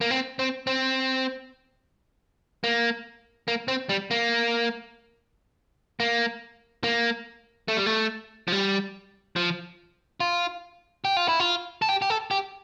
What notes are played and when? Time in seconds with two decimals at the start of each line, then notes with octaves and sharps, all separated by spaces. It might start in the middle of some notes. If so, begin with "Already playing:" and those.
0.01 A#3
0.11 C4
0.39 C4
0.67 C4
2.64 A#3
3.48 A#3
3.68 C4
3.89 G3
4.11 A#3
6.00 A#3
6.84 A#3
7.68 A3
7.77 G3
7.86 A3
8.48 F3
8.52 G3
9.36 F3
10.20 F4
11.05 G4
11.17 F4
11.28 E4
11.40 F4
11.82 A4
11.89 G4
12.02 G4
12.10 A4
12.31 G4